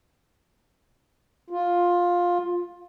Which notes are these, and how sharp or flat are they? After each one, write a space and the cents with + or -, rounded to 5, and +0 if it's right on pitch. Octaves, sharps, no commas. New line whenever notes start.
F4 +10